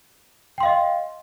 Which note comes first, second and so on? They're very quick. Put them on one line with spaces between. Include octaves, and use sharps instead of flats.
G5 C6 F5 D#5